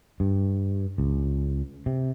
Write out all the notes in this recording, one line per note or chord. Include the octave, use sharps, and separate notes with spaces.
G2
C#2
C3